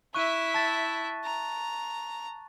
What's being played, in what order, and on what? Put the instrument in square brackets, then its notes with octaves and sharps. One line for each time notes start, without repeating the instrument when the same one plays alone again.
[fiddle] E4 E5 [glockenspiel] C#6 F#6 D#7
[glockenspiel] A5 A6
[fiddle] A#5